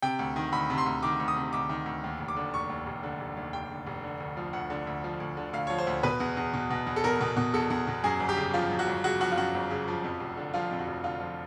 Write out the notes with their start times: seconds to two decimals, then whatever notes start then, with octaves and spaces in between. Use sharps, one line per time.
0.02 C3 G5
0.19 D2
0.36 D#3
0.52 D2 B5
0.70 C3
0.78 C6
0.86 D2
1.03 D#3 D6
1.20 D2
1.28 D#6
1.36 C3
1.53 D2 D6
1.69 D#3
1.86 D2
2.04 D#2
2.19 F1
2.28 D6
2.36 D3
2.54 F1 C#6
2.70 D#2
2.86 F1
3.03 D3
3.20 F1
3.37 D#2
3.53 F1 G5
3.70 D3
3.87 F1
4.03 D3
4.20 D2
4.37 F3
4.53 D2 F#5
4.70 D3
4.87 D2
5.04 F3
5.20 D2
5.37 D3
5.53 D2 F5
5.67 F3 C#5
5.78 C5
5.87 D2
6.03 B2 B4
6.20 E2
6.37 E2
6.53 B2
6.70 B2
6.87 E2
6.96 A4
7.04 E2 A#4
7.21 B2
7.36 B2
7.54 E2 A4
7.70 E2
7.87 B2
8.04 F#2 G#4
8.20 G1
8.29 G4
8.37 C#3
8.54 F3 F4
8.70 F#2
8.79 F#4
8.87 G1
9.04 C#3 F#4
9.20 F3 F#4
9.32 F4
9.37 F#2 F#4
9.54 G1
9.70 C#3
9.88 F3
10.04 F2
10.20 F1
10.37 D3
10.54 F3 F4
10.71 F2
10.79 F#4
10.88 F1
11.04 D3 F4
11.21 F3